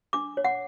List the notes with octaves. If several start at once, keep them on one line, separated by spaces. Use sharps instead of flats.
D4 D6
C#5
F#5